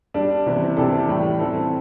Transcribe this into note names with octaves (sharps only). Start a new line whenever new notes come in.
G3 D4 G4
C3 E3 C4
C3 E3 G3 D4 A4
A2 E3 G3
E3 C4 A4